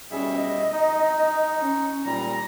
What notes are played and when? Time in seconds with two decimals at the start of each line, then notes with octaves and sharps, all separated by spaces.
0.11 B2 G3 C#4 G#4 E5
0.40 D#5
0.72 D#4
1.59 C#4
2.05 A#2 G3 A#5